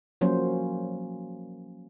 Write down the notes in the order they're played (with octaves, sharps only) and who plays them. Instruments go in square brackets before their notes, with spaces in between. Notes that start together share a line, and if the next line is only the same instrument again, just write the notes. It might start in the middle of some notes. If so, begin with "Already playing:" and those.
[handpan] F3 F#3 A#3 C#4 C5